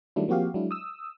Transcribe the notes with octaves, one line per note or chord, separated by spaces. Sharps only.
D#3 F#3 G3 A3 D4 E4
F3 A#3 C4 F#4 G4 F5
F#3 G#3 D4 E4
D#6 E6